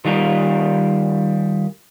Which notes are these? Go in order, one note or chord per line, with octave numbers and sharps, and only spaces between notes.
D#3 G3 F4 A#4